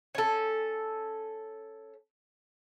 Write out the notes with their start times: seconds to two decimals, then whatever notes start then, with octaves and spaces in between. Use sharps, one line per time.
0.15 C#4 A4